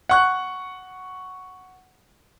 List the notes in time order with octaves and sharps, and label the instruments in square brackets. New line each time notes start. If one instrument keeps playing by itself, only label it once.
[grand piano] F#5 C#6 F#6